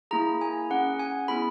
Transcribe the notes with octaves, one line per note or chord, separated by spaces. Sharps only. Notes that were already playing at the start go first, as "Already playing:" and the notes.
A#3 E4 G#4 A#5
G#5
C#4 G#4 F#5
G#5
B3 E4 G#4 B5